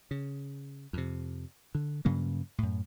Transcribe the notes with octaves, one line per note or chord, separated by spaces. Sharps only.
C#3
F2 C3
D3
G2 C#3 F#3 A#3
F#2 A2